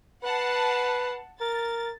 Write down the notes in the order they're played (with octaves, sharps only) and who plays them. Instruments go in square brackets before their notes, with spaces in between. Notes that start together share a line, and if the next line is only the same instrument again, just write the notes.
[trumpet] B4 [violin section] F#5 A5 C7
[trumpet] A#4 [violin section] A6